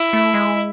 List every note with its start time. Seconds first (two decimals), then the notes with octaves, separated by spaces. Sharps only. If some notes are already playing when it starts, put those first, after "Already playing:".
Already playing: E4
0.13 A3
0.34 G#3